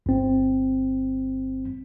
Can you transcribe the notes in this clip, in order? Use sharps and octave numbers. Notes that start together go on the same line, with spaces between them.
G1 C4